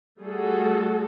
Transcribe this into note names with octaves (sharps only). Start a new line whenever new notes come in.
G3 A3 F#4 G#4 A4